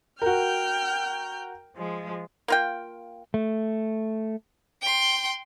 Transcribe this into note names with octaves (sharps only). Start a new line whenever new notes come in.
F#4 A#4 G5 F6 G6
F3 G#3
A#3 F4 G5
A3
G5 C6